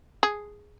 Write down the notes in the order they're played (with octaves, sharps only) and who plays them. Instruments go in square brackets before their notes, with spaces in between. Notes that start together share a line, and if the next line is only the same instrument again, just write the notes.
[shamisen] G#4